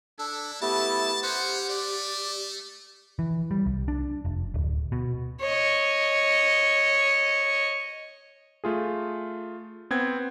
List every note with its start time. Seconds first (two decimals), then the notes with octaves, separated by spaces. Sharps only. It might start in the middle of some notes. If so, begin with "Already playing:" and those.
0.19 D4 E4 A4
0.61 A3 B3 E4 G4 A5
1.23 C#4 C5 F#5
1.69 A3 D5
3.19 E3
3.51 G3
3.66 C2
3.88 D4
4.25 F1
4.54 D1
4.92 B2
5.40 C#5 D#5
8.64 A3 F4 G#4
9.91 B3 C4 G#6